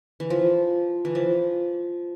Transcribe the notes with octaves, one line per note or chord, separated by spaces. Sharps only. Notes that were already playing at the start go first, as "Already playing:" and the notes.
E3
F3
E3
F3